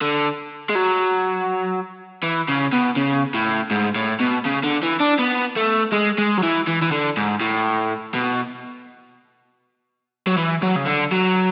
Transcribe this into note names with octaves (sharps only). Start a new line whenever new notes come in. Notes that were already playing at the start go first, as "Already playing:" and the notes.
D3
G#3
F#3
E3
C#3
B2
C#3
A2
G#2
A2
B2
C#3
D3
E3
D4
B3
A3
G#3
G#3
F#3
E3
E3
E3
D3
G#2
A2
B2
F#3
E3
F#3
C#3
D3
F#3